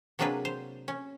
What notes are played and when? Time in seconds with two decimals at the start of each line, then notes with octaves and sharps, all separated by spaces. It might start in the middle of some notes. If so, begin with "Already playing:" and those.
0.19 C3 F#3 A#3 D4 G#4 B4
0.45 C5
0.88 C#4